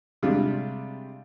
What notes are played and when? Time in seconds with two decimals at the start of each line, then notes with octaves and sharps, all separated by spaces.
0.23 C3 G3 G#3 D4 F4